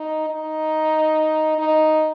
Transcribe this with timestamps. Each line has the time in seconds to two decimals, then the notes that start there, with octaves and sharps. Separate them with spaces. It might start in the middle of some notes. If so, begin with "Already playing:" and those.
Already playing: D#4
0.30 D#4
1.58 D#4